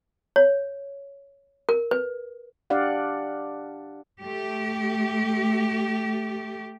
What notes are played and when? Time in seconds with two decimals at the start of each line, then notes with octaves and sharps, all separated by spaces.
0.36 C#5
1.69 A#4
1.91 B4
2.70 D4 G4 D5 F5 F#5
4.21 A3 G4